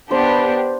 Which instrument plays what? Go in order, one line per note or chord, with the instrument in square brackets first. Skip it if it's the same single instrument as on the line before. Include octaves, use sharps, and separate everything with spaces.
[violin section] B3 D4 G4 [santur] C5